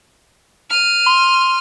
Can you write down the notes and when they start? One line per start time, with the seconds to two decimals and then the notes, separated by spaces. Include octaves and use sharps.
0.69 F6 D#7
1.06 C6